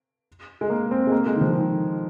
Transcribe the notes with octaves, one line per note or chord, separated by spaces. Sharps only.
G#3
A#3
C4
G#3
A#3
G#3
D#3
F3
D#3